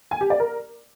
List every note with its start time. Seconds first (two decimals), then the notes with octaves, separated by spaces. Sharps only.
0.11 G#5
0.21 G4
0.30 D5
0.40 A#4